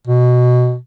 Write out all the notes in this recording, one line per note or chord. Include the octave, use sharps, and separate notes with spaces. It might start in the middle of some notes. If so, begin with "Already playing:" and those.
B2